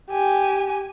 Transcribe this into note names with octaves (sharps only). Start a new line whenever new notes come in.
G4 G#5